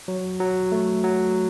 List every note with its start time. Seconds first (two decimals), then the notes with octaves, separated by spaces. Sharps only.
0.08 F#3
0.40 F#3
0.72 A3
1.04 F#3